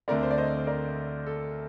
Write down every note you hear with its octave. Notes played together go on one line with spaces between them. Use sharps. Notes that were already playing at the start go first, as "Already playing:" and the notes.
D2 D3 A3 C4 A#4 D5
C5
D5
C5 D#5
A#4 D5
A4